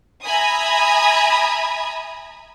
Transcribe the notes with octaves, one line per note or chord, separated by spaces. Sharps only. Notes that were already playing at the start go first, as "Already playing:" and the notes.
E5 G#5 A#5 B5 D#6